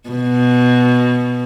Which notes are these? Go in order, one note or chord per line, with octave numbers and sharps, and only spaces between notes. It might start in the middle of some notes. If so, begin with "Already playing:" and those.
B2